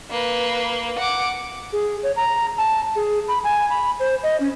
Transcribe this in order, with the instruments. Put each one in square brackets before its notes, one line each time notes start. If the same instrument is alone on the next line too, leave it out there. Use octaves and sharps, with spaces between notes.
[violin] A#3 B4
F#5 D6
[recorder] G#4
C#5
A#5
A5
G#4
B5
G#5
B5
C5
D#5
C#4